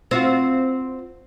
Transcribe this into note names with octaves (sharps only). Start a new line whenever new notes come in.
C4 F4 F#4